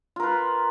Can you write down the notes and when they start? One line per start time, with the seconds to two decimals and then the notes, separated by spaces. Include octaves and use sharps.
0.16 F4
0.20 A#4
0.23 B4